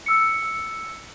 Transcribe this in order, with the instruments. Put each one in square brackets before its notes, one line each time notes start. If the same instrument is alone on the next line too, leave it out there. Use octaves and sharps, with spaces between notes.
[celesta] E6 C#7